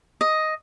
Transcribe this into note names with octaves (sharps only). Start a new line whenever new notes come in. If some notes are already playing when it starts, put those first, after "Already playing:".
D#5